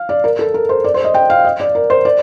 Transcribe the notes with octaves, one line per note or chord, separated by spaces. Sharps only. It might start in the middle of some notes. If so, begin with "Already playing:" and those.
Already playing: F5
D5
A#4
A4
A#4
C5
D5
C5
D#5
G5
F5
D#5
D5
A#4
C5
D5